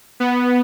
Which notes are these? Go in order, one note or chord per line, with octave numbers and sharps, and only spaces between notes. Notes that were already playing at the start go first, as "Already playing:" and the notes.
B3